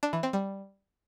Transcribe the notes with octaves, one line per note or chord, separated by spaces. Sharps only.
D4
E3
C4
G3